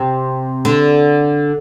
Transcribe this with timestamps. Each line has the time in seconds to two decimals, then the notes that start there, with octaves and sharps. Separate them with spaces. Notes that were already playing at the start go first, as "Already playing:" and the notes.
Already playing: C3
0.65 D3